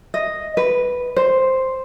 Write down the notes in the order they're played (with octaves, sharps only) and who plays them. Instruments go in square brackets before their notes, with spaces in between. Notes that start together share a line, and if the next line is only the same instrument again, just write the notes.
[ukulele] D#5
B4
C5